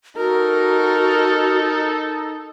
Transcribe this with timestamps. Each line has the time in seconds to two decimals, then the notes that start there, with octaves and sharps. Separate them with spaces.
0.17 D#4 F#4 A4 A#4